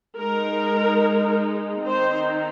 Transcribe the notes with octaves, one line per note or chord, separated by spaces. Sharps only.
G#3 D#4 A#4
D#3 C4 D#4 C5